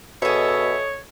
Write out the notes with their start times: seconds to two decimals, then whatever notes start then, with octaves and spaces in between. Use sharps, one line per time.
0.22 B2 G#4 A4 C#5 D#5 E5